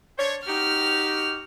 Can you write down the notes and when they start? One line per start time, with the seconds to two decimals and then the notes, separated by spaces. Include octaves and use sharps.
0.18 D4 C5 C#5
0.47 D#4 F#4 G4 F6